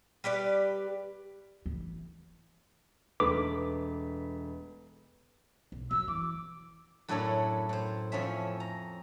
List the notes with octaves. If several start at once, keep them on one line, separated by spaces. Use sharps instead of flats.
G3 G4 B4 D5
E3
E1 A3 B4 D6
B1
F#2 F3 E6
E3 D6
F#2 A2 D4 E4 A4 C#5
A2 C5
F2 F3 C#4 E5
A#5